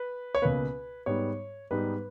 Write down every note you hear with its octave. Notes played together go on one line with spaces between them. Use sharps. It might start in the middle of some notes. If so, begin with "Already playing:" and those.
Already playing: B4
C#5
C#2 B2 A#3 B4
G#2 G3 B3 D#4 C#5
G#2 G3 B3 D#4 B4